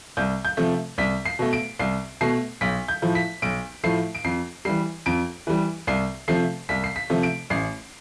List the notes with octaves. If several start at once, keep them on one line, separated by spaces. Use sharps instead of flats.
C2 G6
G6
C3 F3 A3
C2 B6
C7
B2 A3
D7
C2 C7
B2 A3 C7
B1 B6
G6
A2 F3 A3
B6
B1 D7
A2 F3 A3 C7
D7
F2 C7
E3 G3 C7
F2 D7
E3 G3
C2 C7
C3 F3 A3 C7
C2 B6
C7
B6
C3 F3 A3
D7
A1 C7